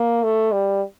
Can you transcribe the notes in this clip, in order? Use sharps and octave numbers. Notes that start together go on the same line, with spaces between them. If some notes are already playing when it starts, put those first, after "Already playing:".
Already playing: A#3
A3
G3